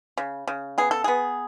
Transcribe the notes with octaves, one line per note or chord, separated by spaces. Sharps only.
C#3
C#3
B3 G#4
A4
B3 G#4